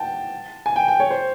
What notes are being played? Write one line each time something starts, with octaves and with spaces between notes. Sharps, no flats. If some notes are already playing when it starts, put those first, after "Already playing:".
Already playing: F#5 G5 A5
G#5
G5
G5
C#5
C5